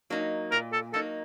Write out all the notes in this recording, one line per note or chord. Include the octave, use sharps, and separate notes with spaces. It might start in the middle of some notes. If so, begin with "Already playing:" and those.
F#3 A#3 D#4
A#2 A#4
A4
F#3 A#3 D#4 A4